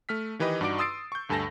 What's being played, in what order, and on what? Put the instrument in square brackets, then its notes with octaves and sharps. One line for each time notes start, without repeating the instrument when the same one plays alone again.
[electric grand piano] A3 F6 B6
D#3 E3 G4 B4 D#5
G2 D#4 F#4 D5 D6 D7
C6 D#6 E6 A6 C7 D7
C#6 G6
D2 G2 A4 G#5 A5 A#6